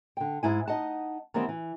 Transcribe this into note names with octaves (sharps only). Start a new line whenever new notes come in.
D3 G5
G#2 E4 G#5
D#4 D#5 F#5 A5
D#3 E3 G3 B3 C4
E3